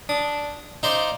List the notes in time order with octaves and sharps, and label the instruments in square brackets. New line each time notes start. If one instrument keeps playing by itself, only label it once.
[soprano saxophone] D4 [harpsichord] D#6
[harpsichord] D#4 C5 D5 [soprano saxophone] F5